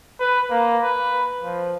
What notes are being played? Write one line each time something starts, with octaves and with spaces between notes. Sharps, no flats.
B4
A#3
B4
F3